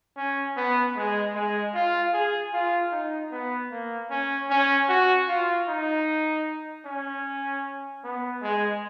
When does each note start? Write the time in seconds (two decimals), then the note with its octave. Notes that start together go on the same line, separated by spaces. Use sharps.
0.17 C#4
0.57 B3
0.96 G#3
1.35 G#3
1.74 F4
2.13 G#4
2.53 F4
2.92 D#4
3.32 B3
3.71 A#3
4.10 C#4
4.50 C#4
4.89 F#4
5.28 F4
5.68 D#4
6.85 C#4
8.04 B3
8.42 G#3